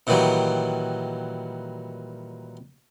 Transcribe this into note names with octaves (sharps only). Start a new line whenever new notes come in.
A#2 D#3 E3 F#3 G3